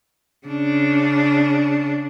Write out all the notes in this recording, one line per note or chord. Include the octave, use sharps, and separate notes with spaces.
C#3 D4